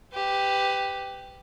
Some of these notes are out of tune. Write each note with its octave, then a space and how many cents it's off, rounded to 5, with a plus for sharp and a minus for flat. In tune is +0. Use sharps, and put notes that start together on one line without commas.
G4 +5 B4 +30